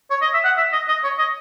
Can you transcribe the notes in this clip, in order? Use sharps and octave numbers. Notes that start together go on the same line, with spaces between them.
C#5
D#5
E5
F#5
E5
D#5
D#5
C#5
D#5